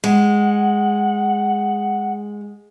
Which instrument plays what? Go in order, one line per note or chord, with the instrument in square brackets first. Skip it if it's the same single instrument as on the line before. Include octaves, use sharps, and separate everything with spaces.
[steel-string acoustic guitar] G#3 [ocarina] F#5